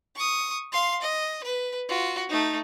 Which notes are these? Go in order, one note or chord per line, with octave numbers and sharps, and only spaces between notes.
C#6 D#6
F5 C6
D#5
B4
F4 F#4
A3 D#4